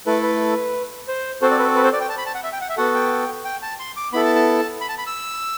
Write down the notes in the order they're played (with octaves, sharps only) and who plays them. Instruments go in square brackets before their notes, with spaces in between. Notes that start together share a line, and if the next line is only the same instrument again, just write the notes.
[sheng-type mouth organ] A3 E4 A4 B4
B4
C5
C4 F#4 A4 C5
D5
B4
B4
C5
D5
G5
A5
B5
A5
F#5
E5
G5
F#5
E5
B3 F#4 A4 F#5
G5
G5
A5
C6
D6
B3 E4 A4 B5
A5
A5
B5
A5
B5
E6